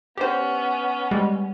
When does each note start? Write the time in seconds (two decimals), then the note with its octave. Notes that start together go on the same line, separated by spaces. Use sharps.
0.18 B3 C#4 G4 C5
1.11 G3 G#3